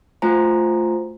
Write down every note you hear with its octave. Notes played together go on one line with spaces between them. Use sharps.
A3 F4 F#4 C5 G#5 A#5